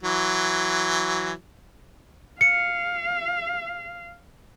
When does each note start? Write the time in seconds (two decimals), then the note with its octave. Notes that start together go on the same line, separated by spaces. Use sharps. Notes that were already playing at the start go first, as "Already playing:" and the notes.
0.03 E3 F#3
2.41 F5 C#7